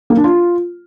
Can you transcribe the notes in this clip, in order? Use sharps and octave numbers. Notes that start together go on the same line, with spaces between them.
A#3
D4
F4